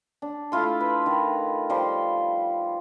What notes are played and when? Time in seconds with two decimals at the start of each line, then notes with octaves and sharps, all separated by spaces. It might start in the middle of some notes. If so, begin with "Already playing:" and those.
0.22 D4
0.52 A3 E4 F4 C6
0.80 B4
1.06 D#3
1.70 F3 G3 C6